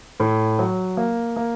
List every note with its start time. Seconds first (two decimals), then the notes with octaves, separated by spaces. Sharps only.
0.20 A2
0.59 F#3
0.97 A#3
1.36 A#3